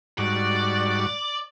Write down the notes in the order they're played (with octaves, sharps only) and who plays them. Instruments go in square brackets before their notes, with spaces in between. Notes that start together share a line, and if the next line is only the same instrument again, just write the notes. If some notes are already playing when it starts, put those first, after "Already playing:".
[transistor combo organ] G#2 G3 F#4 [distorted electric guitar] D5